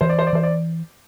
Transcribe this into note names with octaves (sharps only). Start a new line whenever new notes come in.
E3 C5
D5
C5
D5
E3 C5
D5